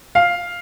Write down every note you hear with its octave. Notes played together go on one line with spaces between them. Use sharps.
F5